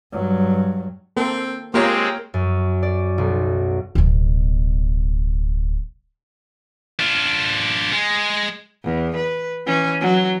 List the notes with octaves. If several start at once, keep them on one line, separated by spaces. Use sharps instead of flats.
G2 F#3
A#3 C4 A4
G#3 A#3 C4 F4 G4 A#4 C#5
F#2
D5
B1
D1 B2
D4 F4
G#3
E2
B4
E3 C#4
F#3